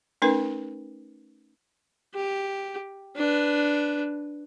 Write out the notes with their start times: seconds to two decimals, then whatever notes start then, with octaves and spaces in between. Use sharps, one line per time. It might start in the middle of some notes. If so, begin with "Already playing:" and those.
0.22 A3 C#4 D#4 A#4 B4
2.14 G4
3.16 D4 B4